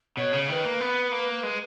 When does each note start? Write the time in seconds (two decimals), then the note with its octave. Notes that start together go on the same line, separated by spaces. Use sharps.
0.17 B2 C#5
0.33 C#3
0.48 D#3 B4 C#5
0.65 A#3
0.80 B3
1.12 A#3
1.43 G#3